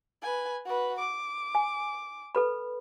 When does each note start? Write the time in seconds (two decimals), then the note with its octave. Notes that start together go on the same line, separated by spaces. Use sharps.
0.22 B4 G#5
0.65 F#4 B4
0.99 D6
1.55 G#5
2.35 A4 B4 B5